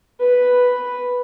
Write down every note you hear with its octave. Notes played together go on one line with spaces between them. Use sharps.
B4